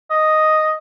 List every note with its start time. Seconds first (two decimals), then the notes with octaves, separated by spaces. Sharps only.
0.10 D#5